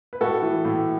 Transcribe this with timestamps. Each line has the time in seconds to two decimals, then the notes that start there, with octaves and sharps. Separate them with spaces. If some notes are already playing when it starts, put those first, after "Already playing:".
0.13 B4
0.21 A2 F#4 A4
0.43 E3
0.65 A2